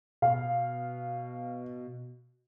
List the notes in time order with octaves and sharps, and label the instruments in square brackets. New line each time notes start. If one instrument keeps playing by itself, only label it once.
[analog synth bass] B2 [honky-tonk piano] F5